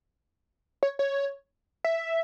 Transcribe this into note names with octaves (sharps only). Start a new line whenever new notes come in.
C#5
C#5
E5